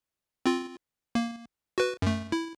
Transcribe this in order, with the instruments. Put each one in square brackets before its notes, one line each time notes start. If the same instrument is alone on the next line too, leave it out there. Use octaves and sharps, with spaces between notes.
[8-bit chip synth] C4 F4
A#3
F#4 B4
F#2 A3
E4